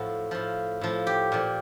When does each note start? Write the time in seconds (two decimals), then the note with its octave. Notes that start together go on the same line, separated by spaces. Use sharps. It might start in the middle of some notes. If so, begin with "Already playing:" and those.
Already playing: A2 F3 F#4
0.31 A2 F3
0.81 A2 F3
1.07 G4
1.32 A#2 F3